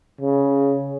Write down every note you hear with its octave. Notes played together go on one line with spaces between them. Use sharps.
C#3